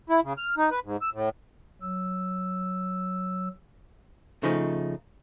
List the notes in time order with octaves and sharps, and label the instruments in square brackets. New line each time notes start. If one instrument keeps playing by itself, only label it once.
[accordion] E4
C#3
F6
D#4
B4
G#2
E6
A2
[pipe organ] F#3 E6
[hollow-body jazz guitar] C#3 F3 A3 D#4